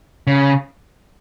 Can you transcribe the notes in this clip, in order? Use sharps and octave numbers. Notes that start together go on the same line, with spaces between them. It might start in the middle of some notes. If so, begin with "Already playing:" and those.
C#3